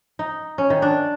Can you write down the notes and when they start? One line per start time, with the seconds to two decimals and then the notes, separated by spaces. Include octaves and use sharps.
0.19 D#4
0.58 C#4
0.70 D#3
0.82 D4